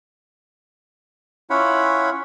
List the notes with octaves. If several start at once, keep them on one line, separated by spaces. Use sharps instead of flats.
C#4 E4 F4 C#5 F#5 B5